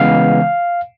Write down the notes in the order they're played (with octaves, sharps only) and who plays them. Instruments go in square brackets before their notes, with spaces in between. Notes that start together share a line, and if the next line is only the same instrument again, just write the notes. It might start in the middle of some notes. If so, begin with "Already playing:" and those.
Already playing: [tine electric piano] C#3 E3 G#3 B3 F5